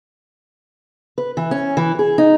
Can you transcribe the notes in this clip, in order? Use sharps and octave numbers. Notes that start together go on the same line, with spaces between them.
B4
E3
C#4
E3
G#4
D#4